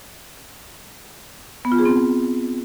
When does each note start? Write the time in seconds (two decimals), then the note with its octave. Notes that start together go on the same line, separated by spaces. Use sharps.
1.65 B3
1.72 F4
1.78 G#4
1.85 C4